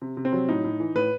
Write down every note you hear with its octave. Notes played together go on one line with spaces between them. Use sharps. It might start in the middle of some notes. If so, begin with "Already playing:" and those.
C3
C3
C4
F#3
A2 D#4
A2
E3
A2 B4